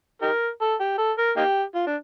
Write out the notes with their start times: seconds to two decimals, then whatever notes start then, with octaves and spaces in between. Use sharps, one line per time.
0.22 D#4 G4 A#4
0.61 A4
0.80 G4
0.98 A4
1.18 A#4
1.37 A#3 D#4 G4
1.75 F4
1.87 D4